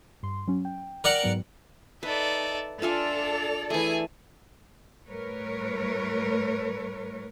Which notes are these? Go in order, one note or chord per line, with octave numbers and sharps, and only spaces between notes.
G2 C6
F#3 C#4
G5
A#4 D5 F#5
G#2 F#3 B3
D#4 A4 B4 D5 E5
D4 F4 A4 D5 E5 G#5 F7
E3 A3 E4 G#4 G#5
A2 G3 A3 A#4 B4 C#5